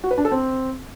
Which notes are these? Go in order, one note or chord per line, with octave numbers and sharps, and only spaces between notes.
F#4
B4
D4
A4
C4